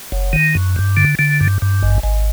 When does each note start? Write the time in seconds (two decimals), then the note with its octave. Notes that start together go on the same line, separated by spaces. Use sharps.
0.12 F#1
0.33 D#3
0.55 F#2
0.76 G2
0.97 D3
1.19 D3
1.41 G2
1.62 G2
1.83 G#1
2.03 G#1